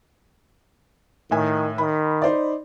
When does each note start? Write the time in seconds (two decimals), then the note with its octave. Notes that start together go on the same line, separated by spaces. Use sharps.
1.31 A2 D#3 E5 G#5
1.78 D#3 B5
2.22 D#4 C5 D5